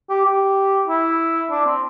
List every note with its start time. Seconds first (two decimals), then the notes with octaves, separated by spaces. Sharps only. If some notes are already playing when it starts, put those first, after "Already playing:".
0.10 G4
0.25 G4
0.88 E4
1.51 D4
1.66 C4